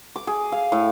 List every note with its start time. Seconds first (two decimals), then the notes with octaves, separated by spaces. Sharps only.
0.16 D6
0.27 G#4
0.52 F5
0.72 A2